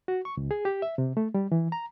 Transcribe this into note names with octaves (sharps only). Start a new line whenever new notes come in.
F#4
C#6
C#2
G#4
G4
E5
C3
A3
G3
E3
A#5